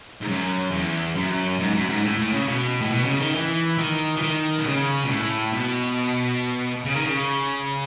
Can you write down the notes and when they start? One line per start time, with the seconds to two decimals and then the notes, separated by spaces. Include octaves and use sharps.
0.21 G#2
0.28 F#2
0.71 E2
1.15 F#2
1.60 G#2
1.74 F#2
1.89 G#2
2.03 A2
2.18 A2
2.32 C#3
2.48 B2
2.81 A2
2.91 B2
3.05 C#3
3.20 D#3
3.35 E3
3.78 D#3
4.16 E3
4.22 D#3
4.58 B2
4.67 C#3
5.05 B2
5.10 A2
5.53 B2
6.85 C#3
6.95 D#3
7.03 C#3